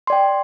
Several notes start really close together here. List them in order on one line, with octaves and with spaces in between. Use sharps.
C6 D5 G5